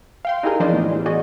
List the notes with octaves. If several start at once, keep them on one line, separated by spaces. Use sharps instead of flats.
F5 G5 C6
D#4 E4 G4 G#4 A#4
E3 F3 D4 C5 D5 D#5
A2 B3
E3
F#4 G#4 D5 D#5 G#5